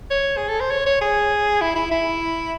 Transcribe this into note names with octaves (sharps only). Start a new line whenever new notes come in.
C#5
G#4
A4
C5
C#5
C#5
G#4
E4
E4
E4